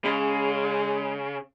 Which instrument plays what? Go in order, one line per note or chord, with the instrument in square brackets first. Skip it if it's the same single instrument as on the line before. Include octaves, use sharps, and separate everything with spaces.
[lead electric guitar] C#3 [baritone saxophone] G#3